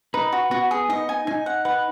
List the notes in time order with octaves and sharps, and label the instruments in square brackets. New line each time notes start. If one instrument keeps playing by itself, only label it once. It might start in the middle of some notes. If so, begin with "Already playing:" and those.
[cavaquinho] D#4 [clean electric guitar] B4
[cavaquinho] F#4
[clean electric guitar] B3 [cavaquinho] F#4
[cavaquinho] G#4
[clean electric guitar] D#4 [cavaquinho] D#5
[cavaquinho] G#5
[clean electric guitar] D#4 [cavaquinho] G#5
[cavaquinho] F#5
[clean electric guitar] B4 [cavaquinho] F#5